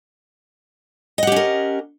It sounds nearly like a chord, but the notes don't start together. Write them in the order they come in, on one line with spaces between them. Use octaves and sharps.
D#5 F#5 G4 C#4 A#4